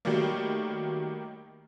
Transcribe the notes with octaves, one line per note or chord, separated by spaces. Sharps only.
D#3 F#3 G3 A3 A#3